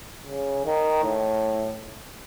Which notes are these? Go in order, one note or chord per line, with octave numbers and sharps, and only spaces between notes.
C#3
D#3
A2